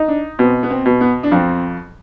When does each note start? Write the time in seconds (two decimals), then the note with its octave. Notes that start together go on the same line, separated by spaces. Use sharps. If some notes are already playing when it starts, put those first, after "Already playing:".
Already playing: D#4
0.08 D4
0.39 B2 C4
0.63 B3
0.70 C4
0.86 B2
1.01 B3
1.23 D4
1.32 F2 C4